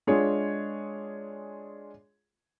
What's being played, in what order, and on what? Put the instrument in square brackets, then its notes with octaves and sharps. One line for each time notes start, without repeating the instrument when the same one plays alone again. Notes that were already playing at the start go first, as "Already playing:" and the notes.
[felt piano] G#3 D4 F4 G#4 C#5